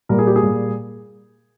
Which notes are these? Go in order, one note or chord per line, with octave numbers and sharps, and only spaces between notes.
A#2 G3 A#3 A#4
G#4
G4
G#4
A#2 G3 A#3